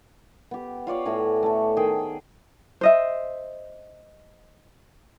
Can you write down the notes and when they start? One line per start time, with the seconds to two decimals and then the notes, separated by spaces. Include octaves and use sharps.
0.51 B3 G4
0.87 F4 C#5 D5 F5
1.05 A2 F#4 G#5
1.43 A3 A4
1.77 D#3 G#4 G5
2.81 C5 D#5 E5